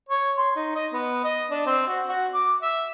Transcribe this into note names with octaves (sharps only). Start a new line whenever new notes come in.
C#5
C6
D#4
D#5
B3
D#5
D4
C4
F#4
F#4
D6
E5